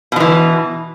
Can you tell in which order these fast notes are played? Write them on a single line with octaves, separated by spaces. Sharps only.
B2 F3 E3